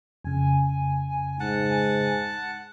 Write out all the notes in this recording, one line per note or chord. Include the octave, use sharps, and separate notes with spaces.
F2 C#3 G#5
G#2 F#5 A5